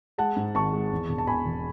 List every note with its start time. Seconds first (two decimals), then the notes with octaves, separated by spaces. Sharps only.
0.18 G#3 F#5 A5
0.36 G#2
0.55 G#1 A5 C#6
0.73 G#3
0.92 E2
1.09 E1
1.18 A5
1.27 B2 G#5 B5
1.46 E1